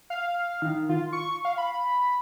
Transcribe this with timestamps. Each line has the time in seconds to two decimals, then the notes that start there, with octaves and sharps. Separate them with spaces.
0.10 F5
0.62 D#3
0.89 F4
1.13 C#6
1.45 F5
1.58 B5